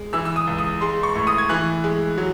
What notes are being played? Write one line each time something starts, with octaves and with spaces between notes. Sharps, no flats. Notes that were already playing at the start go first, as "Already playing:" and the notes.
Already playing: G#3
E3 E6
E6
D#6
C#2
D#6
G#3 C6
C#6
A2
D#6
G#6
E3 F#6
G#3
F#3